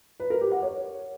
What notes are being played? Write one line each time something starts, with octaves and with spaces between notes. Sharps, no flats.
B4
A#4
G4
F#5
C#5